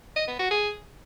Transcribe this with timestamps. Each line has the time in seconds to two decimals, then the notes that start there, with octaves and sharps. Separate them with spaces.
0.16 D#5
0.27 B3
0.39 F#4
0.50 G#4